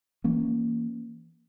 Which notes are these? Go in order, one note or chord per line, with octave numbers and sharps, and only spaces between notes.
E3 A#3 C#4